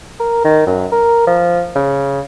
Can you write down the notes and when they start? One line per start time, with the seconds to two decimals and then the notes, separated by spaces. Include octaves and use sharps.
0.20 A#4
0.44 D#3
0.67 F#2
0.92 A#4
1.27 F3
1.75 C#3